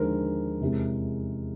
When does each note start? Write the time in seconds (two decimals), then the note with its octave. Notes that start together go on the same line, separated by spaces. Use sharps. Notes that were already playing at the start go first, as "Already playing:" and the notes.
Already playing: D#2 D3 F3 G#3 A#4 C5
0.61 E2 C3 E3 G#3 C#4